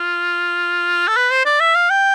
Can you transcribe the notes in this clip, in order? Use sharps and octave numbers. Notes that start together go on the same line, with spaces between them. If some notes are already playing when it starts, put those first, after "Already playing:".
Already playing: F4
A4
B4
C5
D5
E5
F5
G5